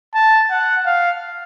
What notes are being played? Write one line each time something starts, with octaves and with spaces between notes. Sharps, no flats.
A5
F#5
F5